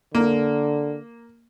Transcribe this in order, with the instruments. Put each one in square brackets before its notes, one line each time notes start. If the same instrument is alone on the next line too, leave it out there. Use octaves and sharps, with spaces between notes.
[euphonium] D3 [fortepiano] A#3